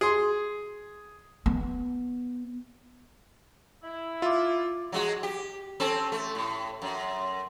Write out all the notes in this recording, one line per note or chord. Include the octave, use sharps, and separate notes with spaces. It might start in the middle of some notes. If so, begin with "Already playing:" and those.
G#4 C6
B3
E4
F4 E5 D6
F#3 G#3 F#4
G4
C4 C#4 A4
A3
A2
F#2